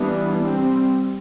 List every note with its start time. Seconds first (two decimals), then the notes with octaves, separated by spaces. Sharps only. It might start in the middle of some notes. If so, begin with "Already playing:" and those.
Already playing: E3 G3 B3 D4
0.41 G3 C4